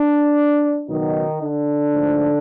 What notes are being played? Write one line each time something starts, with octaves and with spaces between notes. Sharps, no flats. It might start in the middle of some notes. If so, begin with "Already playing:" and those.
Already playing: D4
C#2 B2 D#3 F#3 D#4
D3 D4
G#2 F3 A3